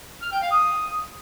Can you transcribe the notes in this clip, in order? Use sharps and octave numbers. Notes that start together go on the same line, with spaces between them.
F6
G5
F5
D#6